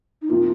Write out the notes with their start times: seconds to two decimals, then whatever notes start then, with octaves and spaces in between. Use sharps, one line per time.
0.22 D#4
0.29 C3 F3 A#3 F4